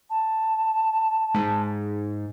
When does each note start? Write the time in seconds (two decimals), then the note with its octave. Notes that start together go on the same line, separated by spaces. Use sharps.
0.10 A5
1.34 G#2